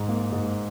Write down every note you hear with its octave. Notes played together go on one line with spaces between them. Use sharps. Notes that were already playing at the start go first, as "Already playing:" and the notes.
Already playing: G#2
A#3
G#2